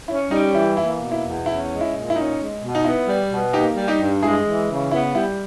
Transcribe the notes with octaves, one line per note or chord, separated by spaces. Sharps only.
C#4 E4
G3 D#4
E3 E4
A#3 E4
B2
E4
E2
C#4 E4
G#3
E4
A#2
E4
C#4 D#4
G#3
B2
D#4
B3 E4
G3
B2
A#3 D#4 G4
G3
D#4 G4
G2
G#3 E4 G#4
E3
C#3
B3 E4
G3 E4